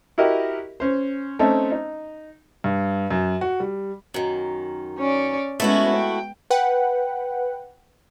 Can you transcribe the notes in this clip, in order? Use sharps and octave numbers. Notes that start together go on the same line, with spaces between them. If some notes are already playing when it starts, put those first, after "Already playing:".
E4 F#4 G4 A#4 D#5
C#4 C5
A3 C4 C#4 D#4
D#4
G2
F#2
F#4
G3
F#2 D#3
C#4 C#5 D5
G#3 A3 B3 C#4 E4 F#4
G5
B4 F#5 G5